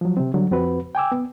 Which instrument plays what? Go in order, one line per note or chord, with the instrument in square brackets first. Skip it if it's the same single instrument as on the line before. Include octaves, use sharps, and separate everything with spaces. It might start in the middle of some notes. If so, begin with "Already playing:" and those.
[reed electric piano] F3 F#3
C3 C4
D3 F#3 G3
F2 C4 F#4 B4
G5 G#5 D6 E6
B3